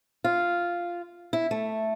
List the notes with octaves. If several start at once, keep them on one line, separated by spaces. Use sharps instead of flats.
F4
E4
A3